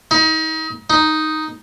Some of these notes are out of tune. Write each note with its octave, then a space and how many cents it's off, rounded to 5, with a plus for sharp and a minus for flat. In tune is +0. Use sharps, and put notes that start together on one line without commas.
D#4 +35
D#4 +0